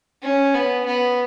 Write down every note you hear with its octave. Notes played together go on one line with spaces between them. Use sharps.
C#4
B3
B3